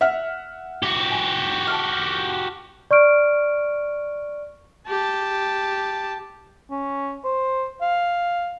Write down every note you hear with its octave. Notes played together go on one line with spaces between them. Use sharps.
E5 F#5 F6
F#4 G4
G#5
A5 F6
D5 C#6 F6 D7
G4 A5
C#4
C5
F5